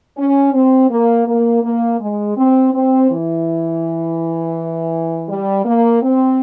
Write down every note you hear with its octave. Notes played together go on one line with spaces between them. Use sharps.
C#4
C4
A#3
A#3
A#3
G#3
C4
C4
E3
G3
A#3
C4